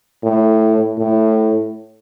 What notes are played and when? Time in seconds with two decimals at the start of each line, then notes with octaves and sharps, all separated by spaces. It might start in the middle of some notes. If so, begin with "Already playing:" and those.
0.23 A2
0.98 A2